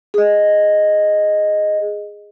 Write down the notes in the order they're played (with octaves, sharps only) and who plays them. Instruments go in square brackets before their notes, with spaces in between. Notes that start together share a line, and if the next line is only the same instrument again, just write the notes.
[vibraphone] G#4 D#5